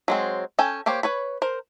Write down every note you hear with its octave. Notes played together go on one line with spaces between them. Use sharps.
F#3 G#3 C4
C#4 A4 G5 G#5
A#3 G4 C5 C#5
B4 C#5 B5
A#4 C5